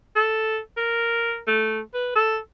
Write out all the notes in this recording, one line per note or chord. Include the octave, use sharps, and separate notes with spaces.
A4
A#4
A3
B4
A4